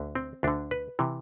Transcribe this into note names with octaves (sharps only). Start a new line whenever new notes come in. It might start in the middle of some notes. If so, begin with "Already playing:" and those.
Already playing: D2 D3
C4
D2 D3 D4
B4
C3 E3